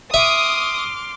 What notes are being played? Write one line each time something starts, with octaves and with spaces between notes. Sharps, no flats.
E5 C6 D6 D#6 F6